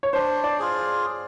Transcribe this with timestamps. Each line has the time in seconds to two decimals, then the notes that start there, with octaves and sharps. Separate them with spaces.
0.03 C#5
0.13 D4 C5
0.44 D5
0.59 F4 G#4